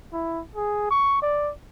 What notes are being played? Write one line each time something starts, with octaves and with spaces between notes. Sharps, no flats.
E4
G#4
C#6
D5